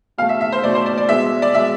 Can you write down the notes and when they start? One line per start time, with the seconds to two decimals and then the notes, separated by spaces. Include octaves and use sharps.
0.18 B2 F5
0.22 A3
0.29 E5
0.41 E5
0.52 C5
0.64 B2 A3 D5
0.75 C5
0.86 D5
0.98 D5
1.09 B2 G#3 E5
1.42 D5
1.54 B2 E5
1.57 G#3